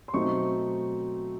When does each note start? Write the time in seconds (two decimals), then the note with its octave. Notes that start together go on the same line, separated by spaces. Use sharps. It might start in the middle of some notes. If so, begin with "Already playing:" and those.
0.08 C6
0.14 B2 F#3 A3 C4 D#4 C#6